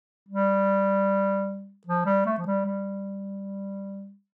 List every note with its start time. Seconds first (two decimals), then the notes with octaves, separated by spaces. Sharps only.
0.28 G3
1.87 F3
2.06 G3
2.26 A3
2.38 F3
2.46 G3
2.66 G3